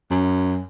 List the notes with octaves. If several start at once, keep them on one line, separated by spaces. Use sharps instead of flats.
F#2